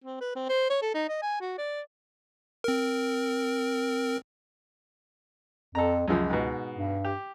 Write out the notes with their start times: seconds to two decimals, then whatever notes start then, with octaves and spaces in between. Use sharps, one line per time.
0.04 C4
0.21 B4
0.35 C4
0.49 C5
0.70 C#5
0.82 A4
0.94 D#4
1.08 D#5
1.22 G#5
1.41 F#4
1.58 D5
2.64 C4 A#4
5.75 F2 A4 A#5
6.08 C#2 F#2 C#3 F3
6.30 G#2 B2
6.77 G2
7.05 G4